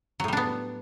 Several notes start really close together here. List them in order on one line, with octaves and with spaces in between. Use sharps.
F#3 A2 G3 D4 B3